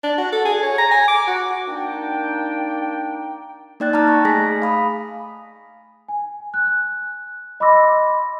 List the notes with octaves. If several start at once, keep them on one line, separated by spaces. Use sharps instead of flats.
D4
F#4
A4
G#4
C#5
A#5
G#5
D6
F#4
A#3 D4 D#4 G5
A#3 D#4 D5 G5 F#6 A6
A5 A#5 D6 F6 A6
A#5 C#6
A3 G#4 G#5 A#6 B6
F5 B5 D#6
G#5
F#6
D#5 B5 C6 D6 E6 A#6